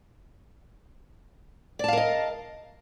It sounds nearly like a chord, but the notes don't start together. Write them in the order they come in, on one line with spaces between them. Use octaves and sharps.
D5 A5 F5 A#4 D#5